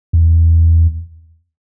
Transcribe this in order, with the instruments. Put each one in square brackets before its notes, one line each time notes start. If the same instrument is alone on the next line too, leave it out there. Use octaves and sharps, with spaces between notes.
[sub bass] E2